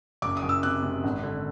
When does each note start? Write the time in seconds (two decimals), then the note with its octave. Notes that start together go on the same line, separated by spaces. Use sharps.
0.22 F#1 D6
0.37 D#6
0.43 F#1
0.49 E6
0.63 C3 F#6
0.83 C3
1.04 G#1
1.23 D3